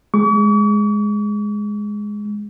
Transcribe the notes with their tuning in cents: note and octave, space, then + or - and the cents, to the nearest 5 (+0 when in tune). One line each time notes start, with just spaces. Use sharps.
G#3 +0 C#6 +45